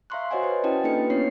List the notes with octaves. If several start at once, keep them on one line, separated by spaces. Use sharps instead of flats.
E5 F5 A#5 C6 C#6 F#6
F#4 C5 C#5 D#5 F#5 G#5
B4 C5
C#4 E4 F#4 D#5 G5 A5
A#3 D4 D#4 A4 B4 C#7
B3 C#4 E4 C#5 C7